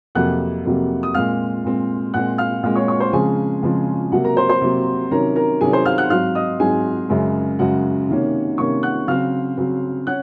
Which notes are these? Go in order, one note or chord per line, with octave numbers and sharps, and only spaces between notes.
F2 C3 F#3 A#3 F#5 F#6
F2 C3 F#3 A#3
D#6
A#2 G#3 C4 F5 F6
A#2 G#3 C4
A#2 G#3 C4 F#5 F#6
F5 F6
A#2 G#3 C4 F5 F6
C#5 C#6
C#5 C#6
C5 C6
C#3 F3 G#3 C4 G#4 G#5
C#3 F3 G#3 C4
C3 F#3 A#3 F#4 F#5
A#4 A#5
C5 C6
C5 C6
C3 F#3 A#3
C3 D#3 F#3 C#4 A#4 A#5
A#4 A#5
C3 D#3 F#3 C#4 G#4 G#5
C5 C6
F5 F6
F#5 F#6
G#2 F#3 C4 F5 F6
D#5 D#6
G#2 F#3 C4 G#4 G#5
F#2 C#3 G#3
F#2 C#3 G#3 F#4 F#5
C3 D#3 A#3 C#4
C3 D#3 A#3 C#4 C#5 C#6
F#5 F#6
C#3 F#3 C4 F5 F6
C#3 F#3 C4
C#4 F#5 F#6